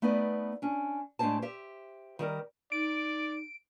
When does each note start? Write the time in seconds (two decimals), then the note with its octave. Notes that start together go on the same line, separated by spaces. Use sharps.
0.02 A3 B3 D#4 B4 D5
0.62 C#4 D4
1.19 A2 G#3 D4 G4 C5 A5
1.42 G4 C5 E5
2.19 D#3 G3 A#4
2.72 D#4 D5 D7